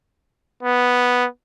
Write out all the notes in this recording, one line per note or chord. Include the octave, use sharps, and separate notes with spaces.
B3